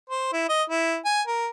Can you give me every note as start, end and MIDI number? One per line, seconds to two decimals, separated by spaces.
0.10 0.31 72
0.33 0.47 64
0.49 0.62 75
0.70 0.97 64
1.05 1.21 80
1.27 1.48 70